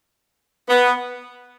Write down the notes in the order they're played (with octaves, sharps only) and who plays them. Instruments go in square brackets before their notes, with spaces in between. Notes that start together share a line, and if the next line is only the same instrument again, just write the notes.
[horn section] B3